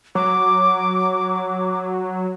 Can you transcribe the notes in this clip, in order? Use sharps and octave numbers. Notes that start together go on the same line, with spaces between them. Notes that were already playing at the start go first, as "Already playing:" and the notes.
F#3 D6